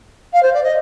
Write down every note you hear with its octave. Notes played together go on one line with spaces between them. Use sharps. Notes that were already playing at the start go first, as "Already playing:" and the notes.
F5
C5
D5
D#5